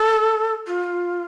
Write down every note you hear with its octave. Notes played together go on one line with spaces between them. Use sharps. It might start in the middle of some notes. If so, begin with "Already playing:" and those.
Already playing: A4
F4